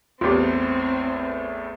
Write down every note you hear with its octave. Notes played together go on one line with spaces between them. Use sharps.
A1 E2 A2 C4 F4 G4